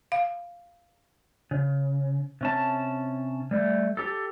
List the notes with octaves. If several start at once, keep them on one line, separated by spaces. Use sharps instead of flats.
F5
C#3
C3 C#4 A5
G3 A3
G4 A4